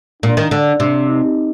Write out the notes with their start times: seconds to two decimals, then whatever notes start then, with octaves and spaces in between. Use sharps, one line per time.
0.22 A#2 D4
0.37 D#3
0.51 D3
0.80 C3 D4
1.09 D#4